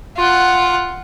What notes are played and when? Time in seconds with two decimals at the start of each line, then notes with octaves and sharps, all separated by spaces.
0.17 F4 F#5